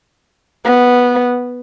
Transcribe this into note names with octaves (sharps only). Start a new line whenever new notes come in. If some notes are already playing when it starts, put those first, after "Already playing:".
B3